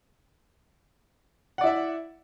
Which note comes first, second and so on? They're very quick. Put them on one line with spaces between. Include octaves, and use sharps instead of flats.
F#5 D5 E4 E5